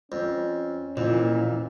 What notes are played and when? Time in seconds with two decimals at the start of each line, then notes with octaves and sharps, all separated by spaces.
0.12 F2 C#4
0.97 F2 A#2 E3